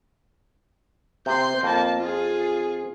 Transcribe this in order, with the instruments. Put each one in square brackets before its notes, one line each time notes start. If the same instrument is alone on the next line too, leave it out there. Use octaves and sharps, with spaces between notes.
[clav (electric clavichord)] C3 [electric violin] C6 G6
[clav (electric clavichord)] F2 [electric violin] A#3 A5
[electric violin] F4 G#4